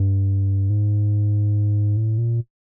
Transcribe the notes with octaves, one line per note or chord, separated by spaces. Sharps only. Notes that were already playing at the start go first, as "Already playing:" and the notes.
Already playing: G2
G#2
A2
A#2